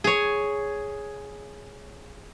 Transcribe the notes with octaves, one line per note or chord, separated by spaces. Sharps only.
G#4 C#5